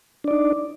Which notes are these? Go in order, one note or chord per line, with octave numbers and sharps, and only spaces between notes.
D4 D#4 D5